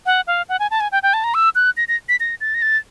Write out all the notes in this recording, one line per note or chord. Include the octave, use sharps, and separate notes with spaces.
F#5
F5
F#5
G#5
A5
G#5
G5
G5
A5
A#5
E6
F#6
A#6
A#6
B6
A#6
A6
A#6
A6